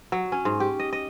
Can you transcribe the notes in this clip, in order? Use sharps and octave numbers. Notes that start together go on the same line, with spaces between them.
F#3
C#4
G#2
G4
D#5
D#5